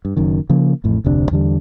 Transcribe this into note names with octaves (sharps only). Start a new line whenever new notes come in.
G2
F#1 F#2 D#3
C#3 F3 A#3
A1 F2 A2
F1 D2 C3 D4
E2 D3 G3